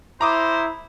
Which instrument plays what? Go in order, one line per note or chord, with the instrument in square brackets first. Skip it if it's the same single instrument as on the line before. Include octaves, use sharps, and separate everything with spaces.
[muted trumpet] E4 [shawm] C5 [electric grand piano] A#5 D6 D#6